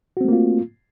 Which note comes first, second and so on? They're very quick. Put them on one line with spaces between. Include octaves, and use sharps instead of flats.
F#4 C4 A3 A#3 F4